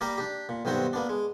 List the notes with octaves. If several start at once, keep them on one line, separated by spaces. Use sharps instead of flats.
G3 A#3 G4 A#4 F5 A#5
D4 G4
A#2
B1 G2 D#3 C4 F#4 C5
A#3 B3 D4
G#3